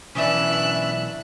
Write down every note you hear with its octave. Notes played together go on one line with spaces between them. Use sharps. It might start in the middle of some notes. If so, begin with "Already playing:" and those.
B1 E3 C#4 D4 B4 E5 F#6